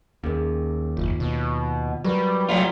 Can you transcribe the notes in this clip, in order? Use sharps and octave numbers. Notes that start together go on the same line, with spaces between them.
D#2 C#4 G#4 A#4
F#1 F4
B2
F#3 G3 A#4 B4 B5
F#3 A3 F4 D5 A5 A#5